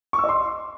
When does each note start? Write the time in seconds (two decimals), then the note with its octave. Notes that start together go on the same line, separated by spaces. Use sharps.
0.13 C#6
0.18 E6
0.24 D#5
0.29 C6